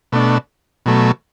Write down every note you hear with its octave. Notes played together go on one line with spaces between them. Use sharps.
B2 A3 D4
B2 F#3 A3